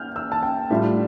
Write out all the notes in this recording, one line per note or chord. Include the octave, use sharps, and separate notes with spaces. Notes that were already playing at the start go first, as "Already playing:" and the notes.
Already playing: F6 G6
E6
A5
G5
A2 G3 D4 F4 E5